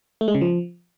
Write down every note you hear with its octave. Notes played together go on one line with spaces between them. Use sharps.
A3
G#3
C#3
F3